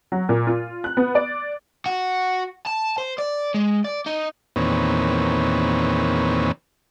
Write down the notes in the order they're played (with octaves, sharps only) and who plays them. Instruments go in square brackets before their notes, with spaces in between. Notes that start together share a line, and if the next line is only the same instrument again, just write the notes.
[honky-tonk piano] F#3
A#2
F4
F#6
B3
D5
[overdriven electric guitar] F#4
A5
C5
D5
G#3
D5
D#4
[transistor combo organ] E2 A#2 D#3 C4 B4 C#5